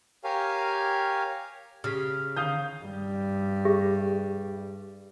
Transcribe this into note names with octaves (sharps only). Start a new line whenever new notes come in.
G4 A#4 C#5 F5 G#5
C#3 G4 F6 B6
D3 D#3 F5 D#6 G6
G2 G3
G4 G#4 E5